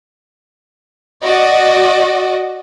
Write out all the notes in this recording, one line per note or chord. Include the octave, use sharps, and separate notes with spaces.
F#4 D5 D#5